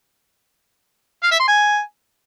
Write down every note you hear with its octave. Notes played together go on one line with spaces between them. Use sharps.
F5
E5
C6
G#5